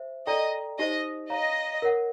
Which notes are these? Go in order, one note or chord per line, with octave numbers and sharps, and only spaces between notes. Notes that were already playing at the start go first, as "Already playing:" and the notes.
Already playing: C5 E5
A4 D5 D#5 G5 A#5
D#4 G4 C5 D#5
C#5 D#5 F5 A#5
A#4 C#5 F#5